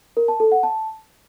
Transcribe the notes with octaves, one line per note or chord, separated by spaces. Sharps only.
A#4
A5
A4
F#5
A5